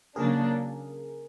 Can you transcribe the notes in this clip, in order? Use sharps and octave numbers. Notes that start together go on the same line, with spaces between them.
C#3 F#3 A#3 D4 G#4 A#4